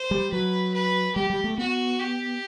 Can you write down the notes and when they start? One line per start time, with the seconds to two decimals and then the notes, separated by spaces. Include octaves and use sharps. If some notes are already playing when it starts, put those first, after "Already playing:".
Already playing: C5
0.11 G3
0.32 F#3 B4
0.74 B4
1.15 G3 G4
1.30 G3
1.44 A3
1.58 B3 F#4
1.99 G4